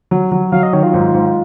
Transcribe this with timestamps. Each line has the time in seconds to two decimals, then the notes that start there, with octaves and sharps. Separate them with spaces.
0.11 F#3
0.32 F#3
0.52 F#3 F5
0.63 D#5
0.73 D#3 C#5
0.83 F4
0.94 G#2
1.14 G#2